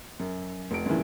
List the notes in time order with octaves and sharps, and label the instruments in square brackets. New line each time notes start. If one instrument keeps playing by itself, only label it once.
[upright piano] F#2
F1 D7
G2 A#2 C#3 E3